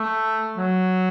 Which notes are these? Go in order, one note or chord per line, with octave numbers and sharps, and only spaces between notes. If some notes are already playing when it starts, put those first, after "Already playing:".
Already playing: A3
F#3